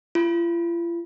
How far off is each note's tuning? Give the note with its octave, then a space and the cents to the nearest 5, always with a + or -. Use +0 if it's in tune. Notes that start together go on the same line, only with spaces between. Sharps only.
F4 -45